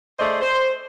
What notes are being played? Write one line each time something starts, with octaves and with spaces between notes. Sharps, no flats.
A3 G#4 C5 D5 D#5
C5